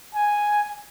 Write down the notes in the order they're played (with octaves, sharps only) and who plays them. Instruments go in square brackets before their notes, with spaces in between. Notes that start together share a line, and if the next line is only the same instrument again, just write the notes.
[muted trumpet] G#5